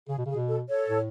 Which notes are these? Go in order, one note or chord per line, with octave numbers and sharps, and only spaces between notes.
C#3 G#4
B2
C#3 G#4
B2
A4
A4 C#5
A2